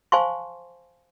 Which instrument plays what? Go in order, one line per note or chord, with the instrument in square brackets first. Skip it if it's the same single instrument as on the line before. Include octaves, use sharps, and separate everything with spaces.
[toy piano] C5 F5 G#5 A5 C6 C#6